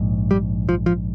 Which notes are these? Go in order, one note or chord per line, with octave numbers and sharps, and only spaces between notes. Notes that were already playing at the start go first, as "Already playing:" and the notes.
Already playing: A#1 G#2
G3
F3
F3